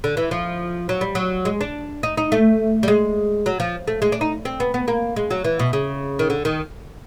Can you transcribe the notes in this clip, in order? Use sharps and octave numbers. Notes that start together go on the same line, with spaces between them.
D3
E3
F3
F#3
G3
F#3
G#3
D4
D#4
D#4
A3
G3
G#3
F#3
F3
A3
G#3
D4
D#4
C4
B3
B3
A#3
G#3
F#3
E3
B2
C#3
D#3
D3
D#3